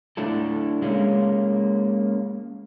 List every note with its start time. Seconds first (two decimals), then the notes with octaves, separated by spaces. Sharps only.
0.17 A3 D4 E4 A4
0.82 G#3 A#3 C#4